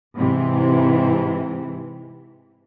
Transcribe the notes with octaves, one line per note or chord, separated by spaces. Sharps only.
G#2 C3 E3